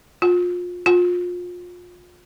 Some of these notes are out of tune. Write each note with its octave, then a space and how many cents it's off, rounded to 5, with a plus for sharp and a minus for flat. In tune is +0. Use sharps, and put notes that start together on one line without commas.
F4 +30
F4 +30